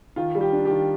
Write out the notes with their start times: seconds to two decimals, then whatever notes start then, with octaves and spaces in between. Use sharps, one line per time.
0.16 D#3 F4
0.35 G3
0.41 G4
0.53 D4
0.65 G4
0.71 D#3